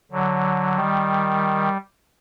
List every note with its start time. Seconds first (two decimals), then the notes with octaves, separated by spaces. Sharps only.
0.12 D3 F#3
0.76 D#3 G3